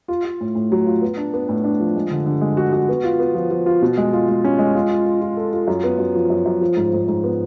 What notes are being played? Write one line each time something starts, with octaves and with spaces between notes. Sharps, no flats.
F4
F4
A2
A2
F#3
F4
B3
D4
B3
A2
D4
F3
G#3
D3
D3
G#3
F#4
F#4
B3
F4
B3
F3
F3
F4
B2
G#3
F4
G#3
C#4
G#3
F4
F4
F4
F4
A4
F4
F#2
B3
F#2
F3
F#2
F#2
F3
G#2
G#2
G#2
B3